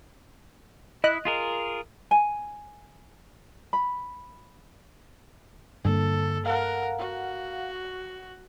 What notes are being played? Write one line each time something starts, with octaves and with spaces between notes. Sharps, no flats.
E4 D#5 F#6
F4 G#4 A#4
G#5
B5
G2 D3 A#3 A4
A#4 F5 F#5
F#4